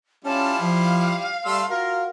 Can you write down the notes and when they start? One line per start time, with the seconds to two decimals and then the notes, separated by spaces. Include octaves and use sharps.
0.25 G3 C#4 E4 F4 A5
0.61 F3 F5
1.45 G3 A3 C6 E6
1.70 F4 F#4 A#4 F5